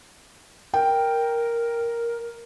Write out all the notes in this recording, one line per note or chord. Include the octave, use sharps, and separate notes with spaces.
A#4 G5